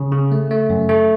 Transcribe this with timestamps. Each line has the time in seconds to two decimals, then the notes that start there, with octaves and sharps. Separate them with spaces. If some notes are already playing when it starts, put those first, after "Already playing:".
Already playing: C#3 C#4
0.12 C#3
0.32 A3
0.51 A3
0.70 F#2
0.89 A3